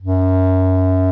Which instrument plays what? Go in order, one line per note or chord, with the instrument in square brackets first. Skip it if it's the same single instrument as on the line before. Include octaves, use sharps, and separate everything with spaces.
[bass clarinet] F#2